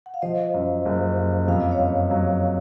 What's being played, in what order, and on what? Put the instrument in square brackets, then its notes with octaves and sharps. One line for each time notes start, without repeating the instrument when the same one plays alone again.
[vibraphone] F#5
F5
[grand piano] F3 [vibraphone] C5 D#5
[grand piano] F#2
F#1
F#2
[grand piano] F2 [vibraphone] F5
[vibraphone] D#5
C#5 F5
[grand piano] F#1
F#3